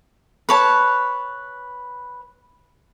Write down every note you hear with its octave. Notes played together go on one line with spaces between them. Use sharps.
B4 C#5 A5